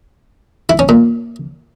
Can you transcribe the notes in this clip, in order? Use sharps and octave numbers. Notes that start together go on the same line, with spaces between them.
E4
C#4
A#2